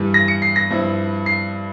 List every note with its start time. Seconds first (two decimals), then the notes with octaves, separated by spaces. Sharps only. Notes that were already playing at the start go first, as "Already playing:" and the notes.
Already playing: G2 E3 G3
0.14 A#6
0.28 C#7
0.42 C7
0.56 A#6
0.70 G2 F3 C4 E4
1.26 C7